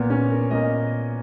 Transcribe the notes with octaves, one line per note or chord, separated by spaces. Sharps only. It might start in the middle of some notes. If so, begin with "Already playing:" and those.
Already playing: A#2 A#3 B3
C#4
A#4
A#2 A#3 D#5